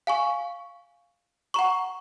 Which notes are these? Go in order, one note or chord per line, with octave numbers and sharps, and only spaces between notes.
F5 G#5 C#6
F#5 A#5 C#6